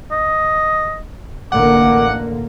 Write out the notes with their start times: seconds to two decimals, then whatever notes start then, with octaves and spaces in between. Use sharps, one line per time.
0.12 D#5
1.52 A1 D3 A#3 F#5 D6